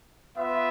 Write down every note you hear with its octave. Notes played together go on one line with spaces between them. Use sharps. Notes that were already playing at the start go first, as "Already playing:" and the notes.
B3 F4 B4 E5